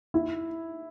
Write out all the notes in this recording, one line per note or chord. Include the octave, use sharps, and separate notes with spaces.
E4